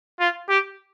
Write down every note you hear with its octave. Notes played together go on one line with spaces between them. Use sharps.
F4
G4